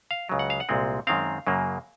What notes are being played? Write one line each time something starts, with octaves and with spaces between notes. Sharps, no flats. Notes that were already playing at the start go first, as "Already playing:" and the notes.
F5
C#2 C#3 F#3
F#5
F5
F#5
C2 A#2 G#3 C4
F#2 D#3 G#3 C4 F5
F#2 C#3 F#3 A#3